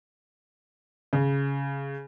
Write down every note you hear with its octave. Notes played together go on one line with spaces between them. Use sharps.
C#3